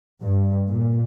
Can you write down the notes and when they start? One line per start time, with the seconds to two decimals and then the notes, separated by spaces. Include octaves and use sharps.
0.22 G2
0.68 A#2